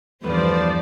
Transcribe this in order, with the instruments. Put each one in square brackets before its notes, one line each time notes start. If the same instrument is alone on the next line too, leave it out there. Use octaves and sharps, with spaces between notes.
[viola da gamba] E2 G2 E3 [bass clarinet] F3 [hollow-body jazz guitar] A3 B4 [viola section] C5 D5